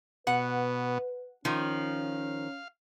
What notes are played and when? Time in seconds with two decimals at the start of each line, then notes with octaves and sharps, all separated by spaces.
0.27 B2 B3 B4 F#5
1.45 D#3 F3 C#4 F5